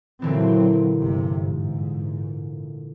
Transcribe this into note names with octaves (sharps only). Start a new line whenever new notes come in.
A#2 D3 E3 F#3 C4
G1 G2 C3
G#2